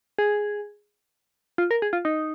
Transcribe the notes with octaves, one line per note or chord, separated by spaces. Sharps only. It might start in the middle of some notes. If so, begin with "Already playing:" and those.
G#4
F4
A#4
G#4
F4
D#4